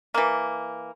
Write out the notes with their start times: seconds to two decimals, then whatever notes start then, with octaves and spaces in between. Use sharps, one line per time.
0.14 E3 A#3